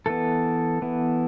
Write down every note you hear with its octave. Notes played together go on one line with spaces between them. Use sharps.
E3 B3 A4
E3 B3